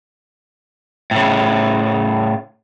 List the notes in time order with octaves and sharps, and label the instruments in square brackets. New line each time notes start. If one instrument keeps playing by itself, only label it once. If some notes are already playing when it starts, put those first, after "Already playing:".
[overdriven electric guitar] A2 C#3